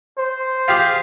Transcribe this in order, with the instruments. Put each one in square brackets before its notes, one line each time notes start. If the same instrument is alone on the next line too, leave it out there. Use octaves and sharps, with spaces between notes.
[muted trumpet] C5
[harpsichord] F4 G4 G#4